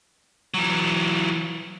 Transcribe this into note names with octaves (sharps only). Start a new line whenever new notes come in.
E3 F#3